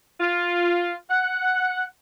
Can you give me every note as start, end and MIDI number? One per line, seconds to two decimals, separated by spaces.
0.20 0.94 65
1.10 1.82 78